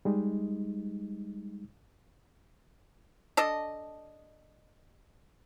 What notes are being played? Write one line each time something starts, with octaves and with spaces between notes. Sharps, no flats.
G3 G#3 D#4
D4 A4 D#5